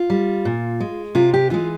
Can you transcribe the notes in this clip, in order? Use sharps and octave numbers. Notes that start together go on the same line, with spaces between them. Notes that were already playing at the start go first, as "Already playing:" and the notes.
Already playing: F4
G3
A#2
G#3
C3 F4
G4
E3 G#3 F4